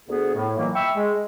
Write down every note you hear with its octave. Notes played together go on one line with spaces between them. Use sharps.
D2 B3 G#4
A2
A#2 D#3 E3 F#3 G3 A#3
E5 G5 B5 C#6 E6
G#3